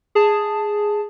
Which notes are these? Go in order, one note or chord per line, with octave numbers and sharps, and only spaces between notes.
G#4 A5